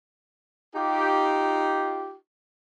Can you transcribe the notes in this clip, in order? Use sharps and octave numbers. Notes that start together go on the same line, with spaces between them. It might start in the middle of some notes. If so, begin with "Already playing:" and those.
D#4 F4 G4